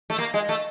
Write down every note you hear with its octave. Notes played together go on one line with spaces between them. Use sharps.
A3
A#3
G#3
A3